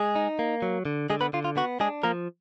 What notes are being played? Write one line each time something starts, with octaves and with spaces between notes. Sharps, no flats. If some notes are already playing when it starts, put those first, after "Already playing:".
Already playing: G#3 G#4
D#4
A#3
F#3
D3
D3 G#3 G#4
B3 B4
D3 F4
F4
B3 F#4
G#3 D4 G#4
F3 A#3 A#4